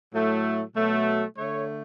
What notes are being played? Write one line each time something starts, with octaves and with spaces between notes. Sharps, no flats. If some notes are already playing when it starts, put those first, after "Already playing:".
A2 F#3 A3
B2 F#3 A3
D3 A3 C#5